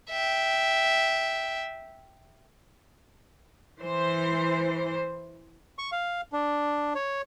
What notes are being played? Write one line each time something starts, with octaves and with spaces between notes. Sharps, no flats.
E5 G5
E3 C5
C#6
F5
D4
C#5